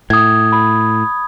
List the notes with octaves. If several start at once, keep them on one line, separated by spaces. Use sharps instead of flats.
A2 D#6 G#6
B5